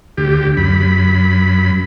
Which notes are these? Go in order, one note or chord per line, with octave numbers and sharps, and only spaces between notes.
D2 G4
F#2 B5